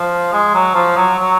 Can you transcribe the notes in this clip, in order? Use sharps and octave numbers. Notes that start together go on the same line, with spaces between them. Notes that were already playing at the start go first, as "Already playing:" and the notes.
Already playing: F3
G#3
F#3
F3
F#3
F#3